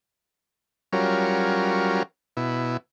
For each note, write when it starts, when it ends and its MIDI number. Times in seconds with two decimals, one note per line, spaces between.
0.93 2.03 54
0.93 2.03 55
0.93 2.03 61
0.93 2.03 65
0.93 2.03 70
2.37 2.77 47
2.37 2.77 64